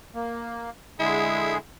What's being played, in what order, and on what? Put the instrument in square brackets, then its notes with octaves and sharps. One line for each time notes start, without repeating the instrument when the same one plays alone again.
[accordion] A#3
[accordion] D3 G#3 G#4 [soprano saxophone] E4